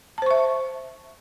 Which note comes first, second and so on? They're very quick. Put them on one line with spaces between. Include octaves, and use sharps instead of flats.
A5 C5 C#6 E5